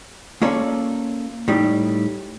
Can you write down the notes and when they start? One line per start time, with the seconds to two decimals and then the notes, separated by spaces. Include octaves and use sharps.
0.42 A#3 C#4 F4 A4 C#5 D5
1.48 A2 G3 D#4